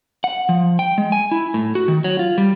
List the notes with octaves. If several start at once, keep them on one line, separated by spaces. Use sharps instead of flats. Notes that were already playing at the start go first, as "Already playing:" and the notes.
F#5
F3
G5
G#3
G#5
E4
A2
F#4
D#3
F#3
F4
G3